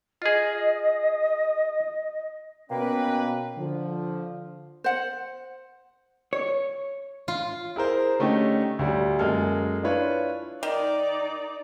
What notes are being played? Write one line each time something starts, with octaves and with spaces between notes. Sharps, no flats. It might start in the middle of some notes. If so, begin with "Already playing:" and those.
F4 G#4 D#5
B2 A#3 C#4 B4 G5
D3 F3
C5 F#5
C#5
F4
E4 G#4 A#4 C5
D3 A3 C#4 D#4 G4
D2 G3
F#2 G#3 A#3 A4 F6
D4 E4 F4 B4 C#5
D#3 D#4 D5